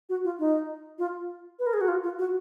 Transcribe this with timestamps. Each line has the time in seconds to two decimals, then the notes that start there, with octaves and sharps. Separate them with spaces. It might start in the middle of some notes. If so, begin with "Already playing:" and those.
0.09 F#4
0.24 F4
0.39 D#4
0.99 F4
1.59 B4
1.67 A#4
1.74 G#4
1.81 F#4
1.88 F4
2.03 F4
2.19 F#4